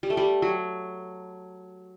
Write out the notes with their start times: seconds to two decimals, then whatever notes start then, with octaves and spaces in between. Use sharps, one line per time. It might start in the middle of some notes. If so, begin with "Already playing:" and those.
0.03 G3
0.10 A3
0.17 G3
0.42 F#3